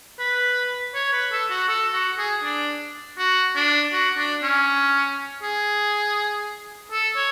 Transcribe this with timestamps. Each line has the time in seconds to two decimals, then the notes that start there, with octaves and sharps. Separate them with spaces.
0.19 B4
0.95 C#5
1.13 B4
1.32 A4
1.50 F#4
1.68 A4
1.93 F#4
2.18 G#4
2.43 D4
3.18 F#4
3.56 D4
3.93 F#4
4.18 D4
4.43 C#4
5.42 G#4
6.92 A4
7.16 C#5